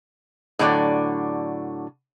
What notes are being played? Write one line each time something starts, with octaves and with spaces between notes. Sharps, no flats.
A2 D3 F#3 D5